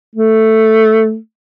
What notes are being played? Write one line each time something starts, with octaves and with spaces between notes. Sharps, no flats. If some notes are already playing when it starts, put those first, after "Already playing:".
A3